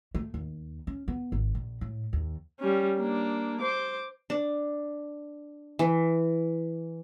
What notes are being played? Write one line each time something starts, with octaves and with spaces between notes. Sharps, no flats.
A3
D#2
C#4
B3
G#1
A#1
A2
D#2
G3 C#4
A#3 D4
C5 D6
D4
E3